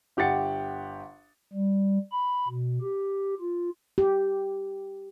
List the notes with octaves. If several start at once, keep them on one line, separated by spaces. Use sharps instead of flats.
G1 G4 F#5 A6 C#7
G3
B5
B2
G4
F4
G4